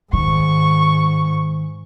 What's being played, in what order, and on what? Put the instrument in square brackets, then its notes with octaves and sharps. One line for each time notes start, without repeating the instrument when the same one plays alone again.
[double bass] G#2 [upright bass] D#3 [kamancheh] C#6